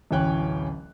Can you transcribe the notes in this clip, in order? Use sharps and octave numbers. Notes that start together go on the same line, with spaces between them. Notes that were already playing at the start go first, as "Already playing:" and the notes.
D1 A1 E3 C#4 G5 F#6